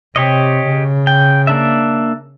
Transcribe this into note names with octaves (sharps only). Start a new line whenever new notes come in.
C3 G4 C#5 D#5
C#3
G5
A#3 D4 E5